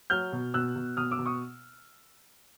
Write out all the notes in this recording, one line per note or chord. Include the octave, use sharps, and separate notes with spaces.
F#3 F6 G6
B2
B2 E6 F#6
B2
B2 D#6 F6
D6 E6
B2
C#6 D#6